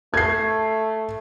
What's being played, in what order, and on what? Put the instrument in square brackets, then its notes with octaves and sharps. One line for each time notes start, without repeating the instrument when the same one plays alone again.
[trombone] A3 [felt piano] G#6 C7